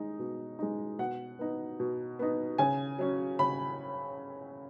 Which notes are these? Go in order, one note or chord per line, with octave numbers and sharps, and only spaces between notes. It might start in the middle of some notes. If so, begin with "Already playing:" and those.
Already playing: G#3 D#4
B2
G#3 D#4
B2 F#5
B3 D#4
B2
B3 D#4
C#3 G#5
F#3 C#4
C#3 B5